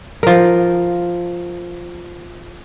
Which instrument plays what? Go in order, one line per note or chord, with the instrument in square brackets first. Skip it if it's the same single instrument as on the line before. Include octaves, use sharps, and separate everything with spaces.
[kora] F3 A#4